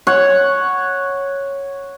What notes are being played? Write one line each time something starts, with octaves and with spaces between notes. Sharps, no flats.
C#5 F#5